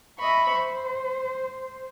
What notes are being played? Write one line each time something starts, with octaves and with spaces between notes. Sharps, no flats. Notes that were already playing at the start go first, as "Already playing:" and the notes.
D#5 E5 B5 C#6
C5